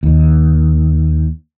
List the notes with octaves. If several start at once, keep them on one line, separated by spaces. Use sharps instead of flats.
D#2